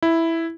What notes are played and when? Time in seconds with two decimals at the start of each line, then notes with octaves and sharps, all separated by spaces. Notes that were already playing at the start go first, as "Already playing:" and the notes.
0.02 E4